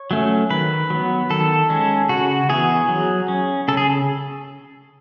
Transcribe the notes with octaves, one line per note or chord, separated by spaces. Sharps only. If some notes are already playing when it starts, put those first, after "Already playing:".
Already playing: C#5
F#3 A3 C#4
D#3 B4
F#3 B3
D#3 A4
G#3 C#4
C#3 F#4
E3 B3 G#4
F#3
C#4
C#3 A4
G#4